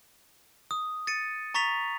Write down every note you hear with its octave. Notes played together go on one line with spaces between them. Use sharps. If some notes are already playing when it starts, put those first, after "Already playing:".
D#6
A6 C#7 D#7
A#5 C#6 A6 B6 F7